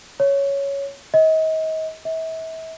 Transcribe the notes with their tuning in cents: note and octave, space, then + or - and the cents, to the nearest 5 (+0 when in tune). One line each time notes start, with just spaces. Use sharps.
C#5 +5
D#5 +35
E5 -35